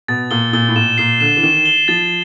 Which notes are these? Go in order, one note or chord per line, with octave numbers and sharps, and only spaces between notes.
B2 A6
A#2 G7
A#2 G7
A2
A#2 E7
A#2 C7
D3 E7
E3
D#3 E7
G7
F3 A6